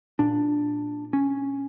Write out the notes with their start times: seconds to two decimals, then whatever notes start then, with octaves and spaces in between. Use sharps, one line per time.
0.19 A#2 D4
1.13 C#4